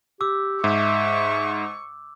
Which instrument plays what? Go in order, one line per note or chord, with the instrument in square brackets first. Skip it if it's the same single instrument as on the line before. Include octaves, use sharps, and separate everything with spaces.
[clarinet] G4 [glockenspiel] D6 E6
[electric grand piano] G#2 [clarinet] E5 [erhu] C#6